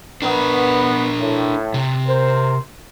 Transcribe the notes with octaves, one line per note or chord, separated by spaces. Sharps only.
B3 D4 A#4
A2
C3
A#4 C5